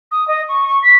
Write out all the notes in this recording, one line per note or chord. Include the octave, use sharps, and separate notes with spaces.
D#6
D#5
C#6
C#6
B6